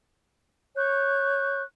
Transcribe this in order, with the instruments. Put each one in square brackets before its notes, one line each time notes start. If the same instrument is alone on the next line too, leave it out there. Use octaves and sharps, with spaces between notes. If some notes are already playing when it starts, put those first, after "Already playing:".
[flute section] C#5 C#6 F#6 G6